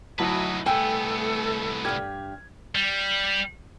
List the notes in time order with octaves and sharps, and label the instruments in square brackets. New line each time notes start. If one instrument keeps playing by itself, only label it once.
[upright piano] D2 F#3 A5 [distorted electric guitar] D#4 B4 [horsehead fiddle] E4 D#5
[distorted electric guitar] C2 B3 [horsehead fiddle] A3 A4 [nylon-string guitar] G5 [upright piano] G#5 E6
[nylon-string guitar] G2 G4 [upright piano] F6 G#6
[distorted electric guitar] G3